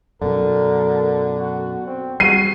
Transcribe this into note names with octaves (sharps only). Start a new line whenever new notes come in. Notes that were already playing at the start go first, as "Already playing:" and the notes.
F#2 B2 D3 F#3 A#4
F#4
C4
G3 F#4 C7 D#7